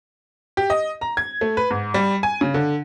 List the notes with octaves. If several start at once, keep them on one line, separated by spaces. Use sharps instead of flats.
G4
D#5
A#5
G#6
A3
B4
G#2
G3
G#5
C#3
D3